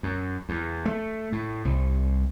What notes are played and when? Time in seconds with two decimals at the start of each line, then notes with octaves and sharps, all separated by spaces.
0.03 F#2
0.49 E2
0.85 A3
1.32 A2
1.65 C2